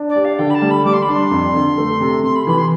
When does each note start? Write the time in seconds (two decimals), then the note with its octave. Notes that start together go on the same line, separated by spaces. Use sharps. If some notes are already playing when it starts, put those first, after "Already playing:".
Already playing: D4
0.09 D5
0.16 G4
0.24 F5
0.38 D3 G5
0.50 B5
0.54 A5
0.62 G3
0.70 B5
0.85 G3 D6
0.93 C6
1.02 B5
1.08 D4 C6
1.31 F2
1.55 D3
1.78 A3
2.00 C3
2.23 C3 C6
2.35 B5
2.47 E3 B5
2.58 C6